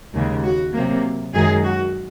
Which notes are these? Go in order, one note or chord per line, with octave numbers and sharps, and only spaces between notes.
D#2 C#3 G#3
F#4
C3 F#3 A#3
F#2 D#3 G#3 G#4
F#4